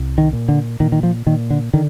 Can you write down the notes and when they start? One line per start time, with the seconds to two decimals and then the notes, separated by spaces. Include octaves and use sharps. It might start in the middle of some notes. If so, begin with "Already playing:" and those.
Already playing: C2
0.18 D#3
0.33 A#2
0.48 D3
0.80 A#2 D#3
0.92 D#3
1.03 F3
1.26 A#2 D#3
1.50 D3
1.74 D3 D#3